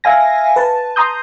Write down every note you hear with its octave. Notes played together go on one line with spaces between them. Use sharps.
E5 F5 G#5 A#6
B4 A5
A#5 C6 D#6 G6